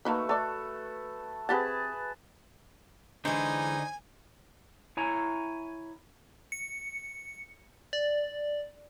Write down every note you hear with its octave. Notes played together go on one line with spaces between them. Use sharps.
A3 A#3 D#4 F#4 B4 B5
A3 A4 D5 D#5
C4 G4 G#4 B4 F#5 A5
D3 E3 G#3 D4 D#4 C5 G#5
E4 C#5 G#5 A#5
C#7
D5